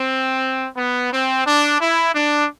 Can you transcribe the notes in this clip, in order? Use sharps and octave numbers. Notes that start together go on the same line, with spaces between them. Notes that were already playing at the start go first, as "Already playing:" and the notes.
Already playing: C4
B3
C4
D4
E4
D4